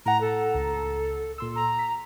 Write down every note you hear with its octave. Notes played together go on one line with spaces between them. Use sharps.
A2 F#5 A#5
A4
C#2 A#5
A#2 C6 E6
A#5
B6